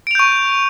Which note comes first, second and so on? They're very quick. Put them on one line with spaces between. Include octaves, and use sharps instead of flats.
D7 F7 G6 C#6